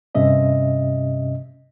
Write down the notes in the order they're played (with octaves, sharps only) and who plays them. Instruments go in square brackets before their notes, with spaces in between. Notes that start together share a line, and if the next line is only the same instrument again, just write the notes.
[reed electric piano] G2 C3 C#4 D#5 E5